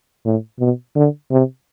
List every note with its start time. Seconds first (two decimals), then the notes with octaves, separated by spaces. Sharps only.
0.26 A2
0.60 B2
0.96 D3
1.31 C3